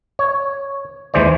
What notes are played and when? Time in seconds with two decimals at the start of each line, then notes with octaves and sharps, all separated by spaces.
0.19 C#5
1.14 D#2 E3 G#3 C5 D5